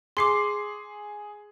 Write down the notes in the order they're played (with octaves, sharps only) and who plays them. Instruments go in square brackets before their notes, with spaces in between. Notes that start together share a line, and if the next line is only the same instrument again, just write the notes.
[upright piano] G#4 C7 [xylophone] C6 D6